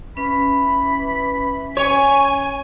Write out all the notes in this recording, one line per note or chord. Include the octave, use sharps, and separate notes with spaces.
E3 C#4 B5
C#5 G#5